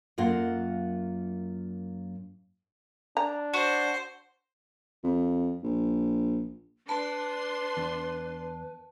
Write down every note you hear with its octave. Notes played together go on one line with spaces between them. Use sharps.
F#2 A#3 F4 F#5
D4 A#5
F#4 C5
F2
A#1
D4 B4 A5 C6
E2